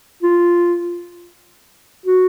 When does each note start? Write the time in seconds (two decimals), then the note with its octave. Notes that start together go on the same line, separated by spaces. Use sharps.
0.23 F4
2.06 F#4